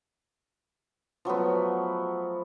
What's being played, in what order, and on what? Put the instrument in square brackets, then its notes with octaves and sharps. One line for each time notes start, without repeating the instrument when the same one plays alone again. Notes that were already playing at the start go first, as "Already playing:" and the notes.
[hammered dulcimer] F3 F#3 A3 B3